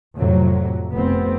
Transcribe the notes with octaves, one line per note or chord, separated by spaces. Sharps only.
F2 A2 C3 F#3
F1 B3 C4